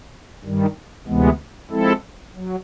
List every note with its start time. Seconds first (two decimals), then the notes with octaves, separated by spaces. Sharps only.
0.44 G2 D#3 G3
1.07 D2 C3 E3 G#3 B3
1.70 F3 G#3 C4 E4 A4
2.34 F#3